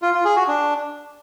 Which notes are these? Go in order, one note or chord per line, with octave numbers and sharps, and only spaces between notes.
F4
F4
G#4
F#4
D4